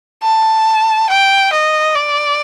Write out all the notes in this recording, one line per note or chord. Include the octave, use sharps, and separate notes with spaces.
A5
G5
D#5
D5